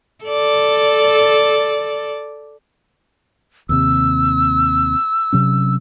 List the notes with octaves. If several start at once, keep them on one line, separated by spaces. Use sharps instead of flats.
A4 D5
D#2 C3 E6
C3 F#3 C#4